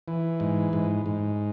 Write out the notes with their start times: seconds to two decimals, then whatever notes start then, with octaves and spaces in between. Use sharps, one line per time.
0.08 E3
0.40 G#2
0.73 G#2
1.06 G#2